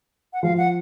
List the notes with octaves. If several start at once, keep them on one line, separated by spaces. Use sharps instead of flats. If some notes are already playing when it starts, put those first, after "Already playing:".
F#5
F3 F5
F#5